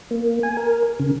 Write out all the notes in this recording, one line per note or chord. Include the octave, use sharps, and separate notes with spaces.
A#3
G#5
A#4
C#3